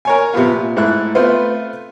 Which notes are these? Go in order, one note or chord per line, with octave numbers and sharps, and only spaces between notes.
A#4 C#5 G#5
C3 F3 B3 F4
A#2
G#2 A3 E4 F#6
A3 B3 C4 F4 B4 C5